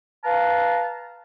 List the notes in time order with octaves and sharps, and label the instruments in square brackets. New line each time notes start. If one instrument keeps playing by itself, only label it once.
[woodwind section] B4 F5 A5 A#5